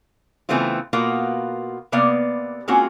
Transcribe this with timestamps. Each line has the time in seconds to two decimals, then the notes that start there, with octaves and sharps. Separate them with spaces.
0.49 C#3 E3 A3 B3 C4 F4
0.93 B2 A#3 F4 F#4
1.92 C3 A#3 B3 D5 F5
2.68 G#3 A#3 C4 C#4 F4 F#4